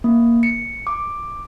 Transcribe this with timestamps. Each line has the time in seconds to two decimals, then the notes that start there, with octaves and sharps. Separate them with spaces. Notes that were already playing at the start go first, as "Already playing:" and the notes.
0.04 A#3
0.43 C#7
0.87 D6